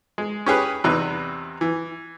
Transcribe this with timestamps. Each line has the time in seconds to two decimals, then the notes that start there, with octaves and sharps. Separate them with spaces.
0.18 G#3
0.46 C#4 G4 G#4 B4
0.84 E2 C3 D#4 B4
1.61 E3